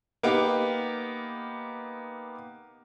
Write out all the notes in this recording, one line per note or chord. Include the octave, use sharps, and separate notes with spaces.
A#3 B3 D#4 G4